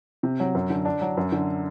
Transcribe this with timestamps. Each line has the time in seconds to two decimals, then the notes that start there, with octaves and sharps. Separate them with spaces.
0.23 C3
0.40 F#3
0.55 F#2
0.70 D3
0.85 D4
1.01 F#3
1.17 F#2
1.32 D3